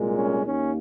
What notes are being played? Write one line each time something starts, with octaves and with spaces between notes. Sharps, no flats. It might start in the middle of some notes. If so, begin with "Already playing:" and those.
Already playing: C2 A#2 G#3
C#4
D#2 D#3 A#3 C#4